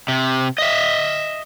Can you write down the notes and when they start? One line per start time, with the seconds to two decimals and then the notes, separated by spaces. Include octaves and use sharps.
0.08 C3
0.58 D#5 E5